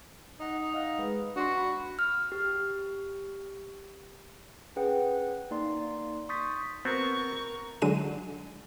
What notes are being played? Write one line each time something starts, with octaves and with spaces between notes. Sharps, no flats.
D#4 D#5 F#5
D#5 F5 F#5
G#3 B4
D4 F#4 C6
B5
F6
G4
C#4 G#4 B4 F#5 G5
A#3 D#4 D5 C6
C6 C#6 D#6 G6 A6 B6
B3 C4 F#4 A#4 C#6
D3 F#3 G#3 D#7